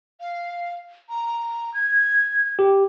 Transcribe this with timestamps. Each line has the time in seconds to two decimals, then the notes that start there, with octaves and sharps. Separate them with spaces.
0.20 F5
1.09 A#5
1.74 G#6
2.59 G4